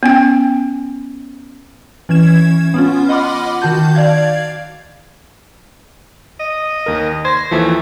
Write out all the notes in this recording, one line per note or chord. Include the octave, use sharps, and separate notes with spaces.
B3 C#4 G5
E3 C#4 G#6 E7
B3 C#4 F4
D#5 F#5 B5 C6 D6 F6
D#3 F#4 A5 G6
D5 F5 G#6
D#5
D#2 A#4
C5 G#6 A#6
D#2 E3 F3 A3